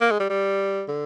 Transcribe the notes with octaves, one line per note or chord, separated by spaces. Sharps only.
A#3
G#3
G3
G3
D3